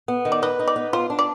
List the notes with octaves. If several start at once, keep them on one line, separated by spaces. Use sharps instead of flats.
B3
D#3
D5
B4 D#5
D#4
D5
B3
F4 C5
D4
D5